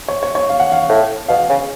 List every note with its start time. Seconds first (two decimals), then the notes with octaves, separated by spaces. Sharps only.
0.08 C#5
0.23 C#5
0.35 C#5
0.49 F5
0.60 F#5
0.72 F5
0.89 A2
1.28 B2 F5
1.50 C#3